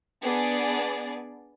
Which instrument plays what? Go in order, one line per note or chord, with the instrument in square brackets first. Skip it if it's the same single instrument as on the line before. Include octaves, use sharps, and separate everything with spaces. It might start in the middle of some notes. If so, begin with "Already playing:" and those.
[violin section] B3 D4 G#4 D5